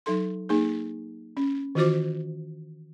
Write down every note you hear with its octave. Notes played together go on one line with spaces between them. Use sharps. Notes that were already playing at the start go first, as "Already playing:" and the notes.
F#3 D#4 A4 C6
A#3 D#4 G#4
C#4
D#3 E3 F4 F#4 C5 D6